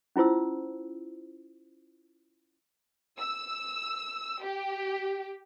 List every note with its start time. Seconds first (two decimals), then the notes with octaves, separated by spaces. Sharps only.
0.16 C#4 E4 F4 C5 E6
3.18 E6
4.44 G4